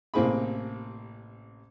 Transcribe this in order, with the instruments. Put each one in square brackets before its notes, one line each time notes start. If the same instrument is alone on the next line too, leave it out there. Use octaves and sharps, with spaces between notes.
[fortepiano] A1 C3 A#3 C4 G#4 B5